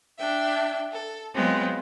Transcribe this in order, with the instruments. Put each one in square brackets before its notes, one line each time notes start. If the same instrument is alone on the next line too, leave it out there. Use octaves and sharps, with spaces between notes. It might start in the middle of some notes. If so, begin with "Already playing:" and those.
[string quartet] D4 E5 G5
A4
F#3 G#3 B3 C4 F4